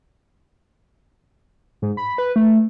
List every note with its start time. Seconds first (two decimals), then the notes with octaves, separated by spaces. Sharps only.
1.82 G#2
1.97 B5
2.18 B4
2.36 A3